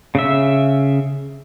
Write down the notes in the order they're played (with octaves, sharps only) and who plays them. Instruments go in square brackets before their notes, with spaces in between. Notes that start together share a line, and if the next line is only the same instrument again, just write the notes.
[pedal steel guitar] C#3 E5